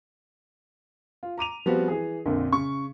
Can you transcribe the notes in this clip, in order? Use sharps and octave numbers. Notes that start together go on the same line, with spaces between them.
F4
A#5 D6 D#7 F7
F3 G3 B3 C4 F#4 G4
E3 G#4
A#1 F2 A#2 D3
C#3 C#6